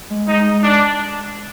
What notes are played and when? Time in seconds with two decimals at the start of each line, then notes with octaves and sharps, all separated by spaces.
0.10 G#3
0.28 G#3 D#4
0.62 D4